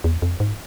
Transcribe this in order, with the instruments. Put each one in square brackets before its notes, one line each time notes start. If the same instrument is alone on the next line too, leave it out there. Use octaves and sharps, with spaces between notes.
[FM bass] E2
F2
G#2